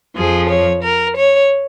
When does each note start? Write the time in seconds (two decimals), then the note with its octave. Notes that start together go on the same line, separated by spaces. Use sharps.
0.16 F2 F3 G#4
0.49 C#5
0.83 A#4
1.16 C#5